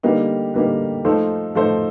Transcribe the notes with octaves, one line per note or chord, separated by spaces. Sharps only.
D3 G3 A#3 D#4 G4
D3 G3 A#3 D#4 G4
F3 A3 D#4 A4 C5
F3 A3 D#4 A4 C5